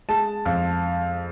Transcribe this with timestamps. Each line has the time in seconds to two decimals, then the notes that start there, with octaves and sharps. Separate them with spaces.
0.09 G#3 A5
0.45 F2